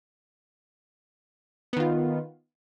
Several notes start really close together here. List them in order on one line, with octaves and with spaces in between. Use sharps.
B3 D#3 F4